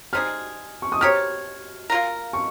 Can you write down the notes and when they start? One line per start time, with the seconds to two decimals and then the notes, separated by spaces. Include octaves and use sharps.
0.13 G3 C4 D#4 G#4 F6
0.82 C#6
0.92 D#6
1.01 C4 G4 A#4 C#5 F6
1.90 A#3 F4 A#4
2.33 C#6